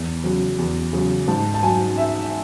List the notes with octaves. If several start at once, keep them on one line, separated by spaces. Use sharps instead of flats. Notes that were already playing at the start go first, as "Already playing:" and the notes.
Already playing: E2
C#3 F#3
E2
C#3 F#3
G#2 A5
A5
F#3 G#5
E5